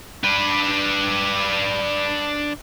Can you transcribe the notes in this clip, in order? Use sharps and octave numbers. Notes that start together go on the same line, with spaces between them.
D4 B4